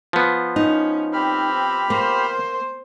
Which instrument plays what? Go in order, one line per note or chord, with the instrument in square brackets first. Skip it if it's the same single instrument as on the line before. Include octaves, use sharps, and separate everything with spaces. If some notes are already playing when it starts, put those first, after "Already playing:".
[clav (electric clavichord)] F3 B3
[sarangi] C#4 [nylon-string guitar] D#4
[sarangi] C4 [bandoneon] G4 B5 F6
[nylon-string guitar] A#3 [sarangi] C5